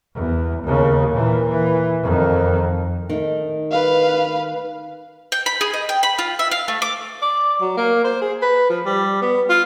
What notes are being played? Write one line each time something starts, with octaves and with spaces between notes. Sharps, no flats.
E2
D#2 C#3
A#2 E3
E3
F2 D#3
D#3 A3
B4 F5
G5
B5
G#4
D#5
G5
B5
F4
E5
F5
A3
D6
D5
F#3
A#3
C5
G#4
B4
F3
G3
B3
F4